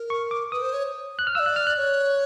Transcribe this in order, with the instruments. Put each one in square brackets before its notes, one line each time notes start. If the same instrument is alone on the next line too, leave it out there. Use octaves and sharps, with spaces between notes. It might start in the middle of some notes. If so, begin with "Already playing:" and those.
Already playing: [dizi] A#4
[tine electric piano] C#6
D6
[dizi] B4 [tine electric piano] D#6
[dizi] C5
C#5
[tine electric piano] F#6
F6
[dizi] F5 [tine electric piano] E6
[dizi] D5
[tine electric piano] F#6
F6
F#6
[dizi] C#5